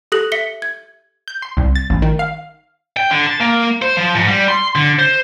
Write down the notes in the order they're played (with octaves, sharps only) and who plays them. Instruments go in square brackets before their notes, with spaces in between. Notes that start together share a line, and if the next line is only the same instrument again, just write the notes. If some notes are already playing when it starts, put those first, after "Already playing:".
[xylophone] G4 A4 D#6 F#6 A#6 F#7
E5 B6 C#7 G7
G#6
[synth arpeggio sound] G6
C6
C2
A6
A1
D#3
F5
[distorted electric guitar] G5
D3
A5
A#3
C5
F3
G#2
G3
C6
D3
C5